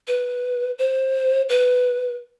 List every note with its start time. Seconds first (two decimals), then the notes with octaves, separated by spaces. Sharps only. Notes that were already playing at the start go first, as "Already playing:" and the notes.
0.08 B4
0.78 C5
1.49 B4